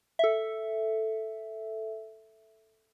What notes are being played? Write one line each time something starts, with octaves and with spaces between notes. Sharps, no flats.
A4 E5